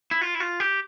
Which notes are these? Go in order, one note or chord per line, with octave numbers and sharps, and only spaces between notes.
E4
F4
E4
F4
G4